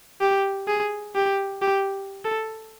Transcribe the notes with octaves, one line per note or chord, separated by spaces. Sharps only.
G4
G#4
G4
G4
A4